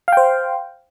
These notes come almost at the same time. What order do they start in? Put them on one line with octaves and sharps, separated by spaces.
F5 G5 C5